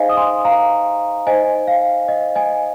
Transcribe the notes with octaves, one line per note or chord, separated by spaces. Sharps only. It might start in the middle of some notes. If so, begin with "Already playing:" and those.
Already playing: D#4 G#4 C5 D#5 F5 G#5
D#6
G#5 C6
F5 A#5
D#4 C5 D#5 G#5
F5
D#5
D#5 G#5